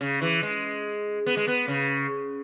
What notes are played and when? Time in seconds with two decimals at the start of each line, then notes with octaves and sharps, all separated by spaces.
0.01 C#3
0.22 E3
0.43 G#3
1.26 B3
1.37 G#3
1.47 B3
1.68 C#3